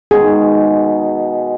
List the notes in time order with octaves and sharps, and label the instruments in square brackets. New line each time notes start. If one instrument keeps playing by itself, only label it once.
[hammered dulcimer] B2 D#3 G#3 [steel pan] G#4